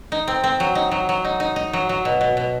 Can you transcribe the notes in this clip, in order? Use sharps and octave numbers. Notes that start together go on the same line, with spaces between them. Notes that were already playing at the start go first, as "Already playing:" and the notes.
D#4
C4
C4
F#3
D#4
F#3
F#3
D#4
D#4
D#4
F#3
F#3
B2
B2
B2